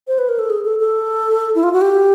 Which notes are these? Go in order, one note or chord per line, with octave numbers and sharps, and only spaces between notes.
C5
B4
A#4
A4
G#4
A4
A4
E4
F4
F#4
G4